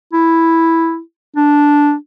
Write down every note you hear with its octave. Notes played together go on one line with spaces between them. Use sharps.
E4
D4